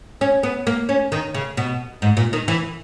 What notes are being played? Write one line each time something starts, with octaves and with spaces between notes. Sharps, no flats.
C#4
B3
A#3
C#4
D#3
C#3
B2
G#2
A#2
D#3
E3